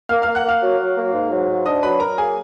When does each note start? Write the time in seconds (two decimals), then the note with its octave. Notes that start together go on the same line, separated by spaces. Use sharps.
0.09 A#3 F5 F6
0.22 A#3 F5 F6
0.35 F#5 F#6
0.45 A#3 F5 F6
0.62 F#3
0.79 F#3
0.96 A#3
1.13 G#2
1.31 F#3
1.49 G#2
1.65 D4 D#5 D#6
1.83 F#3 B4 B5
2.00 F#3 A#4 A#5
2.18 A#3 G#4 G#5